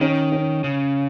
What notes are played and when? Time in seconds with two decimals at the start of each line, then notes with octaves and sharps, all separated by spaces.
0.01 D#3 C#4
0.32 C#4
0.64 C#3